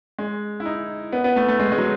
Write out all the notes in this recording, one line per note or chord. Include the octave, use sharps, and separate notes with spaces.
G#3
E4
D#4
B3
B3
A3
A3
G#3
G#3
F#3